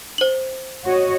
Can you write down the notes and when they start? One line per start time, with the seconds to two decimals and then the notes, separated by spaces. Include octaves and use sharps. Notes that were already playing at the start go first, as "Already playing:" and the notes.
0.18 C5 F#7
0.85 F#4 C#5 D#5